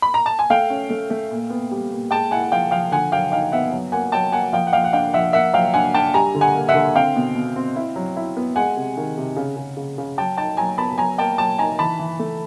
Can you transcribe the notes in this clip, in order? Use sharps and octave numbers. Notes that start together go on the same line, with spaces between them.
B5
A#5
A5
G#5
A3 F5 G5
C#4
A3
A3
A#2
B3
G3
A#2
G#3 G5 A5
E4 F#5 G#5
F3 F5 G5
F3 F5 G5
D3 F#5 G#5
F#3 F5 G5
D#4 F5 G5
B3 E5 F#5
F#3
A#3 F#5 G#5
F#3 G5 A5
A#3 F#5 G#5
F3 F5 G5
F#5
F3 F5 G5
F#5
D4 F5 G5
F3 E5 F#5
A#3 E5 F#5
F#3 F5 G5
D4 F#5 G#5
D4 G5 A5
G3 G#5 A#5
D3
F#5 G#5
A#3
E5 F#5
D3
C4 F5 G5
B2
B2
C4
E4
F#3
E4
B3
G#3 F#5 G#5
C3
D#3
C3
C#3
C#3
C#3
C#3
F#3 G5 A5
D#4 G5 A5
F#3 G#5 A#5
B3 A5 B5
F#3 G#5 A#5
A#3 G5 A5
F#3 G5 A5
D#4 G#5 A#5
E3 A5 B5
E3
A3